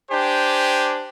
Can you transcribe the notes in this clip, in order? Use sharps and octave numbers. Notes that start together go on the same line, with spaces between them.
D4 G4 C5 G#5